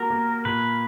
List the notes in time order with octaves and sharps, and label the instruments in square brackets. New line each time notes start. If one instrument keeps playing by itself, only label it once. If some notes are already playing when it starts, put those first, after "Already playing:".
Already playing: [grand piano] A#3 F#4 [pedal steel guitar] A#4
[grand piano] A#3
[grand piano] A#2 [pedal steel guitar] B4